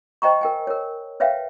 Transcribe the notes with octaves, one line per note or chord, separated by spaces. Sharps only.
C5 D#5 G5 A#5 C#6
A#4 G5 G#5
A#4 C#5
B4 C#5 E5 F5 G5